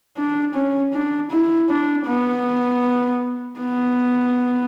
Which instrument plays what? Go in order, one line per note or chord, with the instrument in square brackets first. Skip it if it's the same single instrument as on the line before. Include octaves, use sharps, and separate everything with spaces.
[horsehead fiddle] D4
C#4
D4
E4
D4
B3
B3